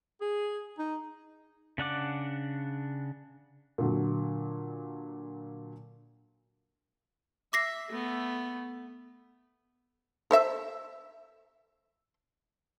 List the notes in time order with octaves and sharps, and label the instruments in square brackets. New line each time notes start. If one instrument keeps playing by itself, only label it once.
[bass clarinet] G#4
D#4
[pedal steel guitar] C#3 D4 F#5 D6
[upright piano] A#2 D3 F#3
[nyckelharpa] E5 [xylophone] D6 A#6 C7
[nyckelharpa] A3 B3
[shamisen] A4 C5 E5